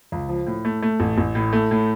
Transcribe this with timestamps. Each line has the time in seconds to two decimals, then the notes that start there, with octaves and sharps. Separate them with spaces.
0.12 C#2
0.29 F3
0.46 A2
0.65 A3
0.82 A3
1.00 A1
1.18 A1
1.35 A2
1.53 A3
1.71 A2